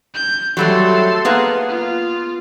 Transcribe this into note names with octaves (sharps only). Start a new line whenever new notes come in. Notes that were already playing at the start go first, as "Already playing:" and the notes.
G6
F#3 G3 A3 A4 C6
A#3 B3 G#4
F4